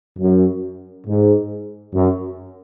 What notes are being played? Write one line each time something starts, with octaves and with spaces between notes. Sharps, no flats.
F#2
G#2
F#2